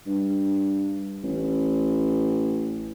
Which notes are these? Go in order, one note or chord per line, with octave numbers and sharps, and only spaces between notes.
G2
A1